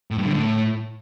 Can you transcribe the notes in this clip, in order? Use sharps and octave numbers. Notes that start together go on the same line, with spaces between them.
A2
G2
D3
A2